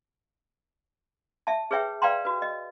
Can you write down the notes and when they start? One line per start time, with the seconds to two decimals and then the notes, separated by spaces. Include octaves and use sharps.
1.47 E5 A5
1.71 G#4 B4 C#5 E5 G5
2.02 B4 D5 F5 G5 A#5 C6
2.25 F#4 B4
2.42 D#5